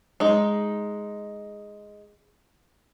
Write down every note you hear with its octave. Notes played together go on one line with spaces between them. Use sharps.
G#3 D#4